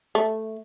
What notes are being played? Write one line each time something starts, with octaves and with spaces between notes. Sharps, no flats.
A3